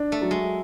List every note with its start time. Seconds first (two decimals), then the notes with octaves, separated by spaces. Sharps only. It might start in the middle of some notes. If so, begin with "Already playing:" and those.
Already playing: D4
0.12 A3
0.21 F#3
0.31 G#3